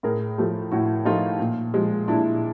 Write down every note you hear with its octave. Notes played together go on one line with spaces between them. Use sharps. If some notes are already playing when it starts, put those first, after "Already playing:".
A2 G#4 A#4
F3 A3
A2 E4 F#4
F3 A3 D#4 F4
A#2
F3 G#3
A#2 D4 E4